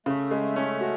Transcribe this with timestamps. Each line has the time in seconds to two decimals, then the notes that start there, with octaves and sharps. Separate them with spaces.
0.06 C#3 A3
0.31 G#3
0.56 C#4
0.81 F#4